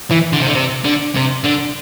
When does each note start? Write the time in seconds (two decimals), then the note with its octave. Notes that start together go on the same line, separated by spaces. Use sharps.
0.11 E3
0.33 D3
0.40 C3
0.47 D3
0.55 C3
0.84 D3
1.15 C3
1.44 D3